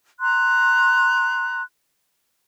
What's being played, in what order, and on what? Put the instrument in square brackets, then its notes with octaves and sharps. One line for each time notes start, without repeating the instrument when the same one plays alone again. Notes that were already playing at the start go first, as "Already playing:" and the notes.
[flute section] A#5 C6 F#6